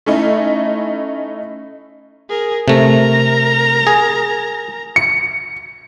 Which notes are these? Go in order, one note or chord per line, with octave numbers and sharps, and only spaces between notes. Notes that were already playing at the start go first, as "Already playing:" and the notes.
A3 C#4 D#4 E4
G#4 A#4
C3 A3 A#4 A#5
G#4
C#7